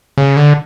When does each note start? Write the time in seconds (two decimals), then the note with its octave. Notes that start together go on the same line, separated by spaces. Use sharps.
0.18 C#3
0.37 D3